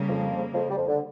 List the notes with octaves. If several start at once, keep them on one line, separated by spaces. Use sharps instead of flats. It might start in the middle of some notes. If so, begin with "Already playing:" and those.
Already playing: C#3 G3 A#3
F2 F3
F2 F3
G3
F2 F3
D3